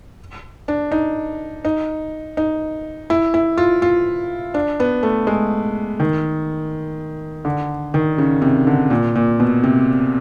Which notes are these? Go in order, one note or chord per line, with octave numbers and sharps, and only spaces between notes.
D4
D#4
D#4
D#4
E4
E4
F4
F4
D4
B3
A3
G#3
D#3
D3
D#3
C#3
C3
D3
A#2
A#2
B2
C3